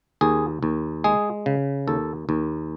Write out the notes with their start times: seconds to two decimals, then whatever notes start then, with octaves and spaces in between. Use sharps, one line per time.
0.21 D#2 G#4
0.63 D#2
1.04 G#3 G#4
1.46 C#3
1.88 D#2 A4
2.29 D#2